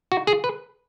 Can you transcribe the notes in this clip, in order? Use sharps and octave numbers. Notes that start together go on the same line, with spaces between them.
F#4
G#4
B4